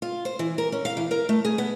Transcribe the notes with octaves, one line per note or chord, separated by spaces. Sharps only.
F4
C5
E3
A#4
C#4
F5
E3
A#4
A3
G#4
B3